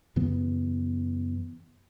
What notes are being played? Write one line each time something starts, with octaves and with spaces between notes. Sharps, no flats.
F#2 C#3 E3 B3